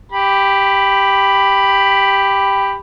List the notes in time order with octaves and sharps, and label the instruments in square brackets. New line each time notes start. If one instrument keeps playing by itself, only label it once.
[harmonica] G4 B5